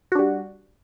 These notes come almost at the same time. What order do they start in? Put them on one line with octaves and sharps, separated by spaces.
F#4 D4 G3